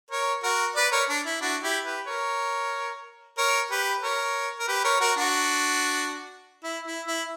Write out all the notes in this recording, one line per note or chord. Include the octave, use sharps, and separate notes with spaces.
A#4 C#5
F#4 A#4
B4 D5
A#4 C#5
D4
E4
D4 F#4
E4 G4
G4 B4
A#4 C#5
A#4 C#5
G4 B4
A#4 C#5
A#4
G4 B4
A#4 C#5
F#4 A#4
D4 F#4
E4
E4
E4